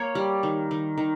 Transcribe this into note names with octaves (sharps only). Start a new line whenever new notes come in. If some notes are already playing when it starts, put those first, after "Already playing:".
Already playing: A#3 C#5
G3
D#3
D#3
D#3